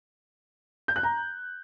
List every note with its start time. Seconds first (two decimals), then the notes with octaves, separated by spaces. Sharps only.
0.88 G6
0.96 F#6
1.03 A#5